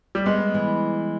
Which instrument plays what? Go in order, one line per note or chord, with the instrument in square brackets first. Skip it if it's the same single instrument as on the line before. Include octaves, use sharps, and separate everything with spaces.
[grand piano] G3
[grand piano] G#3 [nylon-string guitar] B3
[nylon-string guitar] E3